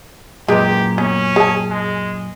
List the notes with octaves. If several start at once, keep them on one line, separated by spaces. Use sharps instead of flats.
F#2 A#2 G#3 G4 B4
B3 C#4
G#4 A5
G#3